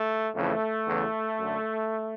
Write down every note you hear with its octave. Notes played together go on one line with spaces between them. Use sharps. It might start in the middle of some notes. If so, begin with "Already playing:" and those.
Already playing: A3
F2 C#3 E3 A3
E2 C#3 E3
F#2 D3